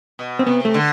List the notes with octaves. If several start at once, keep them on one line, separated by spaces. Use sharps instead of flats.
B2
C4
C3 B3
A3
D3